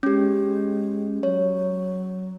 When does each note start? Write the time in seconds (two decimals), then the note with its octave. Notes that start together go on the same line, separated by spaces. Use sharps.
0.03 G#3 C#4 G4
1.23 F#3 C#5